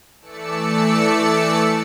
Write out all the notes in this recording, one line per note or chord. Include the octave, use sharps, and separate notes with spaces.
E3 A3 D5 A5 E6 C#7